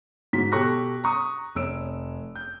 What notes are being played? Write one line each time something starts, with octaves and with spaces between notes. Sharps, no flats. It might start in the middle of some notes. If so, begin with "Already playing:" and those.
G#2 F#4 B6
B2 G4 A4 C#6 F#6 A#6
A#5 C#6 D#6
F1 C#5 E6 D7
G6